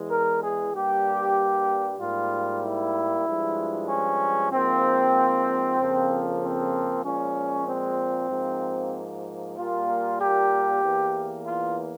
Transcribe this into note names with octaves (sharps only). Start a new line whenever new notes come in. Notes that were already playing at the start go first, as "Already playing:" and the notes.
Already playing: E2 E3 G#3
A#4
G#4
G2 G3 A#3 G4
G#2 G3 A#3 F4
E4
G2 F3 G#3
C#4
G#2 F3 A#3 C4
F2 C#3 F3 A#3
C4
A#2 F3 G#3 C#4
C4
G#2 F3 A#3
A#2 G3 A#3 F4
G4
E2 E3 A#3
F4